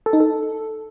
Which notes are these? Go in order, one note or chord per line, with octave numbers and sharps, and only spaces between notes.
A4
D#4
A4